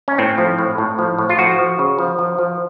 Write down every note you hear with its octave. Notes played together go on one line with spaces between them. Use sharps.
C#4
A2 C4
F3
A2
A2
F3
A2
F4
F3 F#4
F3
C#3
F3
F3
F3